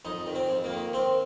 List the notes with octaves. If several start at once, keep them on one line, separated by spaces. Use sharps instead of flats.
F2 D#4
D#3
C4
F2
A#3
D#3
D#3 C4